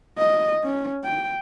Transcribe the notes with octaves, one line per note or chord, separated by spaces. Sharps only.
D#5
C#4
G5